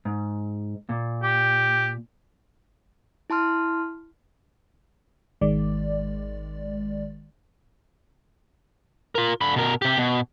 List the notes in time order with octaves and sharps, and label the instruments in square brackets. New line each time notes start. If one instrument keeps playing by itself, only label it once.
[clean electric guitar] G#2
A#2
[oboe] G4
[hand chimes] E4 A5 C6 F6
[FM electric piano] G#1 D#3 G#3 D5
[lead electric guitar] F4 A#4
D3 B5
B2 A#4
C3 G4
B2